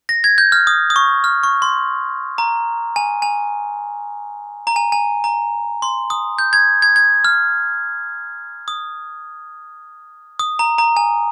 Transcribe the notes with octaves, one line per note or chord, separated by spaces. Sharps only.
A#6
G#6
G6
F6
D#6
D#6
C#6
F6
C#6
C6
A#5
G#5
G#5
A#5
G#5
G#5
A#5
C6
D#6
G6
G#6
G#6
G#6
F6
D#6
D#6
A#5
A#5
G#5